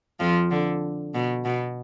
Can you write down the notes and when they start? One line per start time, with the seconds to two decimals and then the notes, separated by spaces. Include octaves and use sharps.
0.20 F2 F3
0.51 D3
1.15 B2
1.45 B2